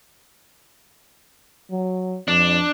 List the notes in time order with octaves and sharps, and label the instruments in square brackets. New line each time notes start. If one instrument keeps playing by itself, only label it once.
[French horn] F#3
[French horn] F2 [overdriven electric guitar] D4